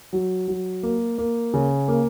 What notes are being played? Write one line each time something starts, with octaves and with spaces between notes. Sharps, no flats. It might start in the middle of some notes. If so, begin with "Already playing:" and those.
F#3
F#3
A#3
A#3
C#3
A#3